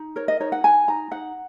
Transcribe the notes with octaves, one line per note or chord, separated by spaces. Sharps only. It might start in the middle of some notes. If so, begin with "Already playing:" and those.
Already playing: D#4
A#4 C#5
D#5
D#4 C#5
F#5
D#4 G#5
D#4 A#5
D#4 F#5